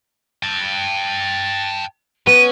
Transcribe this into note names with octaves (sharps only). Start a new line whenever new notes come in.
G5 A5
B3 C#4 D#7